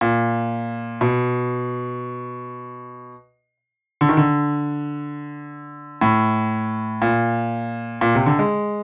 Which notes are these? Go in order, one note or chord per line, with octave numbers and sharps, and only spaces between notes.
A#2
B2
D3
D#3
D3
A2
A#2
A#2
C3
D3
G#3